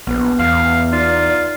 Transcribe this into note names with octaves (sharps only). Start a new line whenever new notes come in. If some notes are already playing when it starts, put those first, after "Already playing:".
A#1 B3 B4
E2 F5
D#4 F4 D5